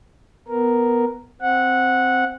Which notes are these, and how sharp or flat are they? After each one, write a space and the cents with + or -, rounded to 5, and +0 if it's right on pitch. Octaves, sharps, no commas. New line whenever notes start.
B3 +0 A#4 +0
C4 +0 F#5 -10